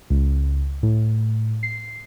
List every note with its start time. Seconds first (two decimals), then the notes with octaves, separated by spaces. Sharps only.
0.10 C#2
0.83 A2
1.63 C7